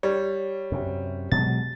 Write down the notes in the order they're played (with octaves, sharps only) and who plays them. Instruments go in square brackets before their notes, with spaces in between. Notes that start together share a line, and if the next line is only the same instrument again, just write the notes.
[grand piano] G3 [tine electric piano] C#5
[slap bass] F#2 C3
[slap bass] B2 F#3 G#3 [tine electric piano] A6